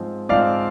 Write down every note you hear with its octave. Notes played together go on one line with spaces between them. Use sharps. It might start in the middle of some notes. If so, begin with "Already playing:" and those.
Already playing: G#2 F3 C4
G#2 F3 C4 D5 F5